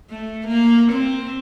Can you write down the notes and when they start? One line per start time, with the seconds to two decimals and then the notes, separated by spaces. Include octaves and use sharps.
0.10 A3
0.47 A#3
0.92 C4